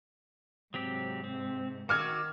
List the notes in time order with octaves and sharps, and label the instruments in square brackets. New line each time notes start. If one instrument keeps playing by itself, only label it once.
[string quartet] G#2 C3 [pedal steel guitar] F#3 C4 G4
[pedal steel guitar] C4
[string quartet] D#3 E6 [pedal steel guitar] F#4 [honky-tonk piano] D6 F6 G#6